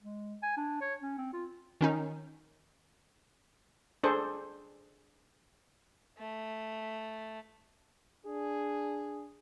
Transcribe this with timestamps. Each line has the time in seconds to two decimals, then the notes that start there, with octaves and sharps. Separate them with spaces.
0.01 G#3
0.43 G#5
0.57 D4
0.81 C#5
1.02 C#4
1.18 C4
1.33 F4
1.81 D#3 C#4 D#4
4.03 D4 G#4 A4 C5
6.18 A3
8.25 D4 G#4